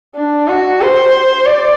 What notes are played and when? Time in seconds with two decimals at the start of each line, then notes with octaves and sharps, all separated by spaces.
0.16 D4
0.48 F#4
0.81 C5
1.46 D5